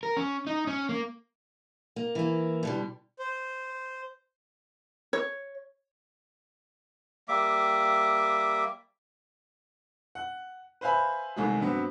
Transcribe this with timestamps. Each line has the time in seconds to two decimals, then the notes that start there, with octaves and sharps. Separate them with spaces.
0.03 A#4
0.17 C#4
0.47 D#4
0.67 C#4
0.89 A#3
1.96 A#3
2.15 E3 A#3
2.63 B2 D3 G3
3.19 C5
5.13 C#5
7.28 G3 A#3 E5 D6
10.15 F#5
10.81 B4 C5 E5 F5 G#5 B5
11.36 C2 D#3 G#3 A3 G#4
11.60 G2 F#3 B3 C4